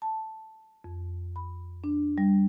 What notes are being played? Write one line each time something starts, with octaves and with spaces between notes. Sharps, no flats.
A5
F2
B5
D4
G3